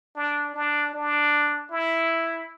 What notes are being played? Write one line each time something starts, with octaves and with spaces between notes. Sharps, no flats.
D4
D4
D4
E4